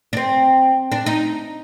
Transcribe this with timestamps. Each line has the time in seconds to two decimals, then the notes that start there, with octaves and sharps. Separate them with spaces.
0.13 D4
0.17 C4
0.92 D4
1.06 D#4